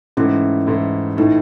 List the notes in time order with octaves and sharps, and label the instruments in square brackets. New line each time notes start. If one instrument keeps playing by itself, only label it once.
[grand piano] G#2 E3 A3 E4 [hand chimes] C#4
[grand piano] G#2 E3 A3 E4
[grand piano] A2 E3 A3 [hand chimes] D#4